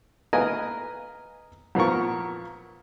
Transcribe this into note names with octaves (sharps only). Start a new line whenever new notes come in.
A#4 B4 D#5 F5 G#5 A#5
F2 A#2 B3 F4 A#4 C#6